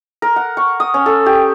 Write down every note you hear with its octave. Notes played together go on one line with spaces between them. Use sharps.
A#4
F#5
C#6
D#6
C#4
A4
G4